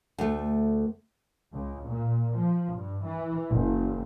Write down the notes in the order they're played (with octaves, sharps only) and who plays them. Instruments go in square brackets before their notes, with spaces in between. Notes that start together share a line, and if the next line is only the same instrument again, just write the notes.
[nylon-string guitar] D2 A3
[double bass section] C#2
A#2
F3
G2
E3
F#1